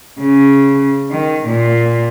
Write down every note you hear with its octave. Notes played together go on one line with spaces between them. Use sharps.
C#3
D#3
A#2